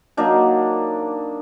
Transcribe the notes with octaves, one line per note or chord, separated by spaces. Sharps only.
F#3 A#3 D4 D#4